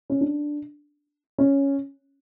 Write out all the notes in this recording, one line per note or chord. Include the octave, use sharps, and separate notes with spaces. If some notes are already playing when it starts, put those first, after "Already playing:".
C#4
D4
C#4